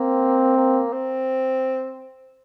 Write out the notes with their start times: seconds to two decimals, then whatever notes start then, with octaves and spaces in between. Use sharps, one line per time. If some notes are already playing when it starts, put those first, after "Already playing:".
Already playing: A#3 C4
0.57 A#3
0.93 C4